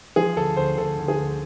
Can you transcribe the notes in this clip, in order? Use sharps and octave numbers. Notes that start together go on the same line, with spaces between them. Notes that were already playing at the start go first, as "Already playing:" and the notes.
F3 G#4
D2 A4
D2 C5
D2 A4
D2
G#4
D2